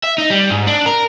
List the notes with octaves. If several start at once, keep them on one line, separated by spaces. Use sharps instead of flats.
E5
D#4
G3
G#2
D4
A#4